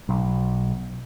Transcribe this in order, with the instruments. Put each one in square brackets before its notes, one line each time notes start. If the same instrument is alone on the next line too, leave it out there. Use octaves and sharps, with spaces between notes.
[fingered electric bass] B1